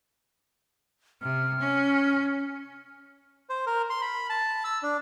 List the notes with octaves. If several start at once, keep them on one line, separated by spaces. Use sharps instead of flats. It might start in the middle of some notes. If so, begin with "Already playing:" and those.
C3 F6
C#4
C5
A#4
C6
B5
A5
E6
D4